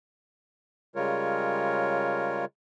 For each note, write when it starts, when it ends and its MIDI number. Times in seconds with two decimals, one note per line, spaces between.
0.96 2.45 49
0.96 2.45 55
0.96 2.45 56
0.96 2.45 65
0.96 2.45 70
0.96 2.45 73